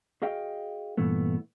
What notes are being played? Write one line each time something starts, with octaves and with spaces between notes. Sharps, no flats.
F#4 G#4 D#5 F5 G5
G2 A#2 E3 A3 B3